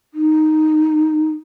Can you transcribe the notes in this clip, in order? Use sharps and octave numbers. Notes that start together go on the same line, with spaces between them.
D#4